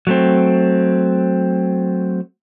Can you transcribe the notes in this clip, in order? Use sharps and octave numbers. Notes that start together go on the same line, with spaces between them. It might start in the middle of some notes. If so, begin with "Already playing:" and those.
F#3 A3 C4